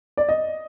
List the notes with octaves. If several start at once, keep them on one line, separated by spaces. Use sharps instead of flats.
D5
D#5